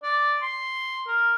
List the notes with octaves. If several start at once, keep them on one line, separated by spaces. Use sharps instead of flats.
D5
C6
A#4